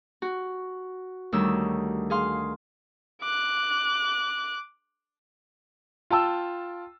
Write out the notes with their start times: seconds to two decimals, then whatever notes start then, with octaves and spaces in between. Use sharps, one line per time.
0.22 F#4
1.32 D2 D#3 G3 C#5 E6
2.10 G#4 F5 C6
3.22 D6 F#6
6.10 F4 G5 A5 E6